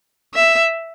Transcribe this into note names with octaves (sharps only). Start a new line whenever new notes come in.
E5